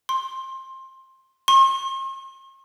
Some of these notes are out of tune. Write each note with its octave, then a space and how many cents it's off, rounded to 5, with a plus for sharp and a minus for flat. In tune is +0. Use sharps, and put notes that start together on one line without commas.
C6 +20
C6 +45